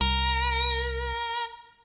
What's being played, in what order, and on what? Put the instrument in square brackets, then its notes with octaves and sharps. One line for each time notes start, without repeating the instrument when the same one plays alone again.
[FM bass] C2 [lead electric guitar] A#4